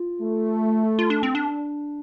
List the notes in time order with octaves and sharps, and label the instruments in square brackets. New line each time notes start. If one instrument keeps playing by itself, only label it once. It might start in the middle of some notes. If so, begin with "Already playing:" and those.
Already playing: [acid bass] F4
[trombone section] A3
[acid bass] F4
D4
C4
D4